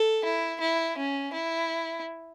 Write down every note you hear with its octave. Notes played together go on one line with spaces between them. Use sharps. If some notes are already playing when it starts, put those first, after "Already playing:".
Already playing: A4
E4
E4
C#4
E4